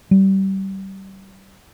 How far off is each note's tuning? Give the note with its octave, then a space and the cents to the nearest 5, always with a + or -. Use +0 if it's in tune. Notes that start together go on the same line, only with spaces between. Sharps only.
G3 -25